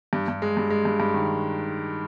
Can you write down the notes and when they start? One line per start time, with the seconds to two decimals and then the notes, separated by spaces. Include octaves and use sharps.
0.13 G2
0.28 G2
0.42 G#3
0.57 G2
0.70 G#3
0.85 G2
1.00 G2
1.14 D#3